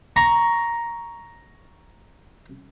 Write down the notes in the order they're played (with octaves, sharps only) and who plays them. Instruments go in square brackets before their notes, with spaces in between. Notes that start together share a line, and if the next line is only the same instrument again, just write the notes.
[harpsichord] A#5 C#6